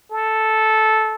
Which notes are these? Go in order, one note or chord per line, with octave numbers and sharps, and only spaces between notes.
A4